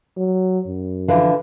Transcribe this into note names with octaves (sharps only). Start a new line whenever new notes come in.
F#3
F#2
D3 E3 F3